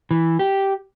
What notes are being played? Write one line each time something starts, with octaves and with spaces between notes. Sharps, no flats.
E3
G4